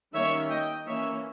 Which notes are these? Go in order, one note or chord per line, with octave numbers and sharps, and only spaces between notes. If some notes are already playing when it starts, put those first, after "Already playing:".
D#3 G3 A#3 C#4 C#5 E5
D#5 G5
E3 A#3 C#4 C#5 E5